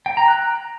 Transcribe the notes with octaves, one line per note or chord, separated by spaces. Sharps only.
G5
A#5
F#6